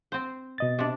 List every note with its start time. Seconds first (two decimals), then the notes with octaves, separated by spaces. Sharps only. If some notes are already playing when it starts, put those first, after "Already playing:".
0.12 C4 C5
0.58 B2 D#5 A6
0.79 C3 D4